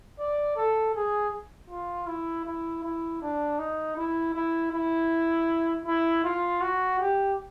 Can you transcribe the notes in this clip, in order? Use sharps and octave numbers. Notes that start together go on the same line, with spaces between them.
D5
A4
G#4
F4
E4
E4
E4
D4
D#4
E4
E4
E4
E4
F4
F#4
G4